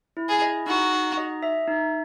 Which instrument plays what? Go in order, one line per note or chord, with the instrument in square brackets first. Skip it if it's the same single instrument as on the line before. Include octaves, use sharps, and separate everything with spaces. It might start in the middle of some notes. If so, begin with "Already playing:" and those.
[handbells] E4
[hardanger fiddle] G#4
[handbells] D#5
[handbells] D#4 [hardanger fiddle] F#4
[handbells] D#4
D#5
E5
D#4